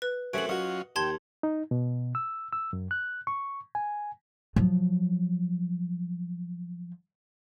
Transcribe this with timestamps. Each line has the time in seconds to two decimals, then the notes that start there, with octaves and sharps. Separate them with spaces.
0.02 B4
0.33 F#2 A3 C4 C#4 F#4 G#4 D7 F#7
0.49 F#3 C#4 F4 F#4 D#5
0.96 D#2 G5 A5 C6 G#6
1.43 D#4
1.71 B2
2.15 E6
2.53 E6
2.73 F#2
2.91 F#6
3.27 C#6
3.75 G#5
4.56 F3 F#3